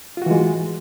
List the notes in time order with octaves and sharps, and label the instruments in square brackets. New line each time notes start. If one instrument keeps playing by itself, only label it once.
[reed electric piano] F4
F#4
E3
G#3